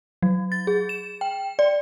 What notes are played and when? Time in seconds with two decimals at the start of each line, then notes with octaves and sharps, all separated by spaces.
0.23 F#3
0.52 A6
0.67 G#4
0.89 E7
1.21 G5
1.59 D5